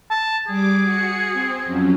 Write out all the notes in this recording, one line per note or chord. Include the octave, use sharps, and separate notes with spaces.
A5
G3 G#4 D6
F#4 C#7
C4
F2 F#3 C#4